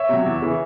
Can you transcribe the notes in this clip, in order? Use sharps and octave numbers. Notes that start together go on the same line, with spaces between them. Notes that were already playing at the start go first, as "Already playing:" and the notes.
Already playing: C#5 E5
C3 F#3
E2
C#3 E3